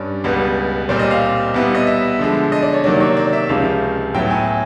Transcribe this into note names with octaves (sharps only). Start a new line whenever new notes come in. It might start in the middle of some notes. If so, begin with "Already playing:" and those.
Already playing: G2 C#4 D5
C#2 B2 G3 B3
A#2 G3 C4 D5
D#5
F5
B2 G3 B3 E4
D#5
E5
D3 F3 G#3
D#5
D5
C#5
C3 D#3 F#3 A#3 D5
C#5
D5
E5
C#2 C3 F3 G#3 C#4 F5
A2 F#3 B3 E4 G5
G#5